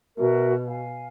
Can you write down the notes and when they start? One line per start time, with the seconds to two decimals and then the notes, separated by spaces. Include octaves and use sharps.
0.17 B2 F#4 A#4 E5
0.66 F5 G#5